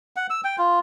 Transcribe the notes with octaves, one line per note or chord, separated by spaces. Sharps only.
F#5
E6
G5
F4